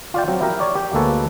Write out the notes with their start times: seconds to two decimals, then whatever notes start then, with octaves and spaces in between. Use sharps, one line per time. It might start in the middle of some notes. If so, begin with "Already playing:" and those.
0.14 F4 D5 G5
0.28 F#3 C4
0.41 E4 G4 A#4
0.60 C#5 D5
0.75 G4
0.93 D2 G#3 A#3 A4 B4 C#5